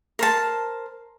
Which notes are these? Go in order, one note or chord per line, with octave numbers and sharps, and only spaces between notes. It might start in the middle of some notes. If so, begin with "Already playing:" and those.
A#4 C5 A5